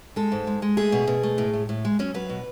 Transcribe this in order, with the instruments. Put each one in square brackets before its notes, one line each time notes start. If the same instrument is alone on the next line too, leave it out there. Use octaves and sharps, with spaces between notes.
[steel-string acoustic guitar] G#3 A4
G#2
G#3
G#3
A3 G#4
B2
B2
A3
A2
A2
A2
G#3
F#3 C#4
F#3 B4
B2